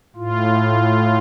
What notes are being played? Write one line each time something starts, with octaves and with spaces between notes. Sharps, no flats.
A2 F4